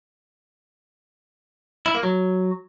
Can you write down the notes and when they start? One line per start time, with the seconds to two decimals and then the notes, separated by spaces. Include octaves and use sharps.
1.86 E4
1.94 A#3
2.03 F#3